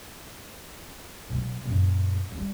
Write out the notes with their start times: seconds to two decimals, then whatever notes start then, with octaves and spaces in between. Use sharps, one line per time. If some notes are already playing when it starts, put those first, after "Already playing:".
1.29 B2 F#3
1.65 F#2 A#2
2.32 F#3 G3